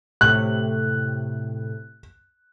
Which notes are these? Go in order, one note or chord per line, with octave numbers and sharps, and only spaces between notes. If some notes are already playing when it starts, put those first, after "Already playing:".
A2 C3 F#6